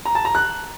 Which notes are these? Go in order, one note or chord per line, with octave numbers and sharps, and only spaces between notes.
A#5
A5
A#5
F#6